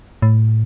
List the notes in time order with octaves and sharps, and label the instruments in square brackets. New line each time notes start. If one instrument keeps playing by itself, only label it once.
[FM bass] A2